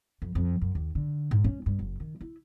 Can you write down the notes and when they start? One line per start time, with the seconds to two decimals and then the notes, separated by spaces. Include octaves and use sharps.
0.22 F2
0.35 F2
0.61 F#2
0.75 D#2
0.95 D3
1.31 G#2
1.44 C#4
1.66 G2
1.79 F#1
2.00 D#3
2.21 E4